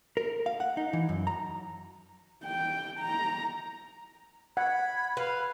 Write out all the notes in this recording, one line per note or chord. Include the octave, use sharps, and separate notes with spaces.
A#4
F5
F#5
D#4
E3
F#2
A#5
G5
A#5
F#5 B5 G#6
B4 F5